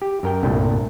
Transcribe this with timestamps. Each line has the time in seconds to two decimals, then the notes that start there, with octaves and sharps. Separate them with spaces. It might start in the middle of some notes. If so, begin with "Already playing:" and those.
0.02 G4
0.23 F#2 A#4 G5
0.43 C2 G2 A#2 A3